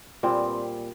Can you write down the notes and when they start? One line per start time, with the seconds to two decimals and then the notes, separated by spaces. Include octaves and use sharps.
0.23 A#2 G3 B3 C4